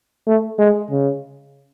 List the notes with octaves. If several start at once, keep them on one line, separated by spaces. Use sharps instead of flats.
A3
G#3
C#3